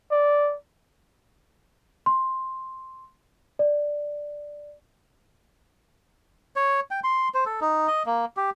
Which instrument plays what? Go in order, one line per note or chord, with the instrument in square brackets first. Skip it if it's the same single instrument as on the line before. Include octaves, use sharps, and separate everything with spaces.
[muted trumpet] D5
[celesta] C6
D5
[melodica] C#5
G5
C6
C5
A4
D#4
D#5
A#3
G4